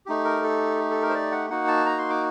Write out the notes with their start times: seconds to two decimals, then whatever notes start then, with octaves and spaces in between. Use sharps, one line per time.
0.06 A3 D#4 G4
0.25 A#4
0.42 A4
0.91 A4
1.03 A#4
1.10 C5
1.14 D5
1.32 F#5
1.50 A#3 D#4 F#4 F#5
1.68 A5
1.86 A#5
1.98 C6
2.10 D6